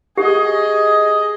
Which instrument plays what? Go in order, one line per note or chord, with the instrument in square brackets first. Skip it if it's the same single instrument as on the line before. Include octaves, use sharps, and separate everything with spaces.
[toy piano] G4 [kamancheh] G#4 D#5